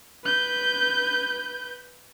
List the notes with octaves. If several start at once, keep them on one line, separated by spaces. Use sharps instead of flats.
B4 G6